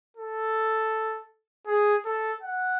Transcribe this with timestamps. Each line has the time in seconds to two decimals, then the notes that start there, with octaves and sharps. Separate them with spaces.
0.17 A4
1.67 G#4
2.05 A4
2.42 F#5